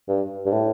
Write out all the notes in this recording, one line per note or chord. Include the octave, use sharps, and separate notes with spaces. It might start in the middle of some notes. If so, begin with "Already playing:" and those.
G2
G2
A2